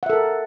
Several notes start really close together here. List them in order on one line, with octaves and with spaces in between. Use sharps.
F#5 E5 A4 A#4